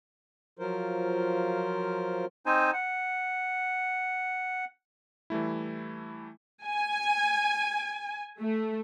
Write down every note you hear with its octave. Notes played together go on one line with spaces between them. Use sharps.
F3 F#3 F4 A#4 C5
C4 D#4 C5 G#5
F#5
E3 G3 A3 E4
G#5
A3